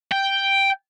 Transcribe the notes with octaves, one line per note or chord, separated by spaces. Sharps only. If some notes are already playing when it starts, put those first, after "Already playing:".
G5